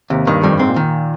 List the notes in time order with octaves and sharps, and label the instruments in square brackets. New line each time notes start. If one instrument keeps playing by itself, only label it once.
[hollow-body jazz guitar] D#2 [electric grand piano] C3
[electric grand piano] G2 [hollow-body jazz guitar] D#3
[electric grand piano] F2 [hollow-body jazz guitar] G3
[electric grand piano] G2
[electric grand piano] G#2 [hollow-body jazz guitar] C4
[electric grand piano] A#2
[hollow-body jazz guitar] D#3